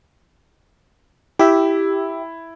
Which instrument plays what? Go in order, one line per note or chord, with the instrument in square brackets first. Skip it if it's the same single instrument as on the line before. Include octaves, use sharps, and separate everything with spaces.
[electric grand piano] E4 [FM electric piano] G4 E5